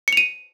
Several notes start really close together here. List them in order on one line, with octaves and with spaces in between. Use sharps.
C#7 F7 D#7